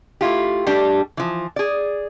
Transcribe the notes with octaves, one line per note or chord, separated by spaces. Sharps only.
A3 E4 F4 G4
G3 A3 D4 G4
E3 F3
G#4 D5